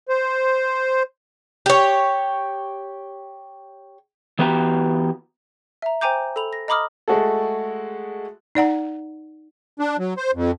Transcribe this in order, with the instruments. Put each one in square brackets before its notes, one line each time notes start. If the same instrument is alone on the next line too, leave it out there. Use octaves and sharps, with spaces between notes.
[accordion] C5
[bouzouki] G4 C#5
[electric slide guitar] E3 B3 F#4 G4 E5 A#5
[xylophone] E5 A#5
C5 G5 G#5 A#5 D6 G6
A4 B5 F7
A#6
D#5 A#5 B5 D6 D#6 F6
[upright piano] G#3 A3 F#4 G#4 A4
[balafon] D#4 D5 F#5 A#5
[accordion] D4
F#3
C5
F2